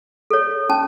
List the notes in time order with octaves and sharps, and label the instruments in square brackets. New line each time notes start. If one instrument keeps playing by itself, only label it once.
[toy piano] A4 C#5
C#4 A5